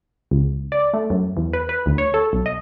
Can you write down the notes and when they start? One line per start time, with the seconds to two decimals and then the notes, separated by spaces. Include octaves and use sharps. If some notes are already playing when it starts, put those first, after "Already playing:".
0.31 C#2
0.72 D5
0.93 A3
1.10 F#2
1.37 E2
1.53 B4
1.69 B4
1.86 D2
1.98 C#5
2.14 A4
2.33 B1
2.46 D#5